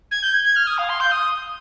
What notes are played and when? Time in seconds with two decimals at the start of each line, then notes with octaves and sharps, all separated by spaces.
0.11 G#6
0.22 G6
0.34 G#6
0.44 G#6
0.56 F6
0.67 D#6
0.78 F5
0.89 C6
1.00 G6
1.11 D#6